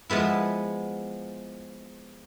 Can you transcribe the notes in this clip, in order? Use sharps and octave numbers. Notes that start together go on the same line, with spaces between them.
F3 G#3 B3 E4